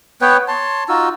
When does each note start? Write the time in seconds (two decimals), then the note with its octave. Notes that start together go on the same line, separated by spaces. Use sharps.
0.21 B3 B4 C#5 G5
0.48 C#5 A5 C6
0.89 D#4 F4 F#4 E6